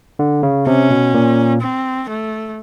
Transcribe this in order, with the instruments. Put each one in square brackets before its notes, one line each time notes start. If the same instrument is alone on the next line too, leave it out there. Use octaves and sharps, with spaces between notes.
[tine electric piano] D3
C#3
[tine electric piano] C3 [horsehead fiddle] C#4
[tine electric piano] B2
A#2
[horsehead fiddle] C4
A3